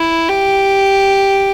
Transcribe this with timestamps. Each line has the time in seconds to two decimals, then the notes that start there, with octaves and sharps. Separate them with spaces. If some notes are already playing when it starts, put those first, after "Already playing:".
Already playing: E4
0.29 G4